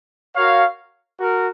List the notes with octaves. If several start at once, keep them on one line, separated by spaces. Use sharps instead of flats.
F#4 A#4 C#5 F5
F#4 A#4